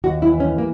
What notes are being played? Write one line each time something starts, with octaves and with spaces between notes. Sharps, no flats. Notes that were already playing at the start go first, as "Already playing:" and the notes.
D#2 F#4
E4
E3
C#4
A#3